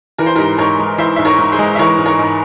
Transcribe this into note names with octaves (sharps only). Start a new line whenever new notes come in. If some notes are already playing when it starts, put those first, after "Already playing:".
E3 A#4
C5
G4 A#4
G#2
G#2 A#4 C#5
G#3
E3 C5 E5
G#2 E5
A#4 C#5
G#2
G#4 C5
G#3
E5
E3 A#4 C#5
G#2
A#4 C#5
G#2